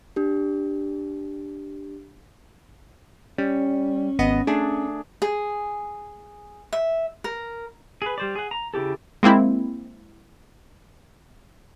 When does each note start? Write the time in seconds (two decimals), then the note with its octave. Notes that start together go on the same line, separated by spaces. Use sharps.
0.16 D4 G4
3.38 G3 C#4
4.19 G#1 B3 D#5
4.47 A3 D4 G#4
5.22 G#4
6.73 E5
7.24 A#4
8.02 G#4 B4
8.18 G3 C5 D5
8.35 G#4 F#5
8.51 A#5
8.74 C#3 E4 G4 A4
9.23 G#3 A#3 C4 E4